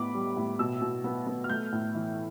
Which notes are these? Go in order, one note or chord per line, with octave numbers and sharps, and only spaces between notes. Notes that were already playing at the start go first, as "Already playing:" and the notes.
Already playing: A2 B3 B5 D6
G3
A2
B2 E6
B2
B3
B3
F6
A3 G6
A2
E3